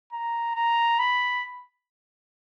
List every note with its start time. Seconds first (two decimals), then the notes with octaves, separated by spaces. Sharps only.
0.13 A#5
0.55 A#5
0.99 B5